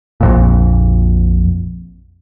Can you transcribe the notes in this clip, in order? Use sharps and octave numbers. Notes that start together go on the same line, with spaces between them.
A#1 F2 A#2